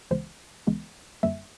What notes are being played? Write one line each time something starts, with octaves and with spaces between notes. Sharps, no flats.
C#2 C#3 E3 G#3 B3 C5
C#2 C#3 E3 G#3 B3
F#2 D3 G3 A#3 E5